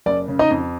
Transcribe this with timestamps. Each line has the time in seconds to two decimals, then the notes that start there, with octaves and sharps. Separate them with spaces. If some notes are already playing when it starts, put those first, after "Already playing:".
0.06 F#1 D5
0.28 C#3
0.39 D#4 D#5
0.51 F2